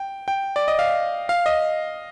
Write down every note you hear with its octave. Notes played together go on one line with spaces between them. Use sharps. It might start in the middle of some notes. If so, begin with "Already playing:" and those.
Already playing: G5
G5
D5
D#5
F5
F5
D#5